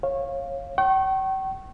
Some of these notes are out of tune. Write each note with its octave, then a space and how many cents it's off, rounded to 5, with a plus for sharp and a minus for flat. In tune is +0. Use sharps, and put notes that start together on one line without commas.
C#5 -20 F5 +0
G5 -40 C#6 -30